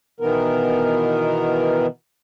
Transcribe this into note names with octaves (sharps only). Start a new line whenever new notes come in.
B2 D#3 E3 B3 A#4